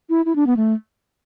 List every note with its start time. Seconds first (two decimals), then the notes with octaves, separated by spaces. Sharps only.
0.10 E4
0.25 E4
0.35 D4
0.47 B3
0.57 A3